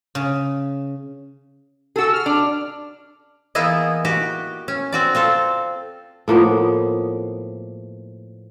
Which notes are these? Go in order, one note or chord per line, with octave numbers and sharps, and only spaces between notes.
C#3
F#4 G#4 A4 E6
F6
D4
E3 A#3 B3 E4 G#4 D#5
F#4 G4
C#4
C4 F#4 D5
C4 F4 A4
A2 F3 A#3 B3